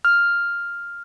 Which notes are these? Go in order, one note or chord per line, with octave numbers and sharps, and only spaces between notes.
F6